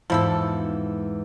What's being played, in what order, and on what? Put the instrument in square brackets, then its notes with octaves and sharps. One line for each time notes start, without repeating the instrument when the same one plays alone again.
[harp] E2 G#2 D6 [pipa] F3 E4 A4